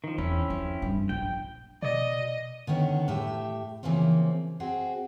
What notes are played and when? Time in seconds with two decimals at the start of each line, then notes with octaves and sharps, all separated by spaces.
0.04 D#3 F3
0.18 E2 C4 C#4 E4
0.50 F2
0.82 G2
1.09 A#1 G5
1.83 B2 D5 D#5
2.67 D3 D#3 B3 C#4
3.08 A2 G4 E5
3.83 C#3 E3 F3 A#3 C4
4.60 C4 F#4 G#4